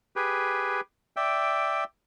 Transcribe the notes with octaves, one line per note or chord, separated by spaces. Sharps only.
G4 G#4 B4
D5 E5 G5